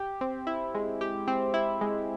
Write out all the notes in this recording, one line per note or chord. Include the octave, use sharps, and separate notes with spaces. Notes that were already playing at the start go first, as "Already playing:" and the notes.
Already playing: G4
C4
E4
G#3
G4
C4
E4
G#3